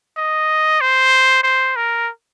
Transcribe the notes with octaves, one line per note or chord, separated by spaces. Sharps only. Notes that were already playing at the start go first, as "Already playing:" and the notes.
D#5
C5
C5
A#4